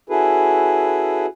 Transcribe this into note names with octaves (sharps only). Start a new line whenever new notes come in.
C#4 E4 F#4 G#4 A4 B4